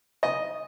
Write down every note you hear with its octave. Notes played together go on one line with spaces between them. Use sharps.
D#5